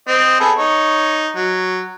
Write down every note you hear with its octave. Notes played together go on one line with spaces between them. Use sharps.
C4 D#5
B3 G#4 A4
D#4 C#5
F#3